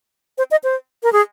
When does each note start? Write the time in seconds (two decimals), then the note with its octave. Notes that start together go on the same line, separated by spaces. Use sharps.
0.38 C5
0.51 D#5
0.64 C5
1.03 A#4
1.13 G#4